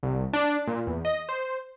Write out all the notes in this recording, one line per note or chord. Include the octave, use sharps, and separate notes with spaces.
C2
D4
A#2
E2
D#5
C5